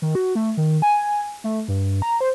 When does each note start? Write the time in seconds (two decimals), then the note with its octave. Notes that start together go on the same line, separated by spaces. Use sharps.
0.02 D#3
0.15 F#4
0.35 A3
0.57 D#3
0.82 G#5
1.44 A3
1.68 G2
2.02 A#5
2.21 C5